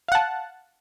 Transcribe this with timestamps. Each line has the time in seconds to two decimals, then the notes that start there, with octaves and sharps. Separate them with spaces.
0.08 F5
0.12 F#5
0.15 A5